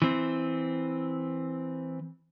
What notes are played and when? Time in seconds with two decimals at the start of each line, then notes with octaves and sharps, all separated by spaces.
0.02 E3 C4